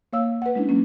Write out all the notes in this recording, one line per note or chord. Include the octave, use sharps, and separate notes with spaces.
A#3 C#5 F5 E6
B4 F#5
G#3 C#4 D4 E4
F#3 G#3 A#3 C#4